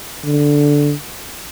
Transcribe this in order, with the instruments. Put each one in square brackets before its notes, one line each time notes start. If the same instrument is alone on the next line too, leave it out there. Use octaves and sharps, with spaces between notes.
[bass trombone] D3